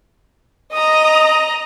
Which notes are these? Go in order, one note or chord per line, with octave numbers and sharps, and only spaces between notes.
D#5 A#5 D#6